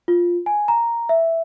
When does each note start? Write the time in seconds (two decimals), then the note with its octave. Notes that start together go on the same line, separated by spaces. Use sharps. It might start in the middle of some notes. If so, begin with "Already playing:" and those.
0.08 F4
0.46 G#5
0.68 A#5
1.09 E5